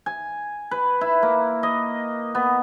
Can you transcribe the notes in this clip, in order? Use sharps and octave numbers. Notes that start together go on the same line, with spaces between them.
G#5
B4
E4
A#3
D#5
B3